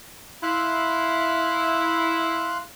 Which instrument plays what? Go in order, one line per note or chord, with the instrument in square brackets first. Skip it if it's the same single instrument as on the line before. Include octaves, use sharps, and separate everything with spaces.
[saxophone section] E4 [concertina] F5 C6 F#6